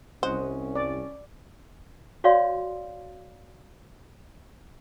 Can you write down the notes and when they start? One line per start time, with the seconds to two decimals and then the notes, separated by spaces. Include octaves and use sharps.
0.23 C2 C#4 C5 D#5 F#5
0.76 D5
2.24 F#4 C#5 D5 F5 C6